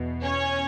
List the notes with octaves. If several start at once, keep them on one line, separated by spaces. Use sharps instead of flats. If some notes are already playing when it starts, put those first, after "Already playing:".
Already playing: E2 B2
C#4 C#5